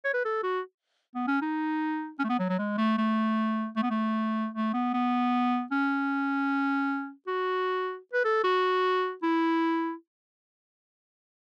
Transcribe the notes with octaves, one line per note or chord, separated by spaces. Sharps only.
C#5
B4
A4
F#4
B3
C#4
D#4
C#4
A3
B3
F#3
F#3
G#3
A3
A3
A3
B3
A3
A3
B3
B3
C#4
F#4
B4
A4
F#4
E4